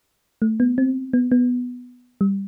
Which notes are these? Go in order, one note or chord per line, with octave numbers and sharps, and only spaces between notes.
A3
B3
C4
B3
B3
G3